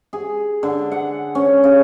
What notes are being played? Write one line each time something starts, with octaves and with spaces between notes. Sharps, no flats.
G#4
D3
F#5
C#4
C#3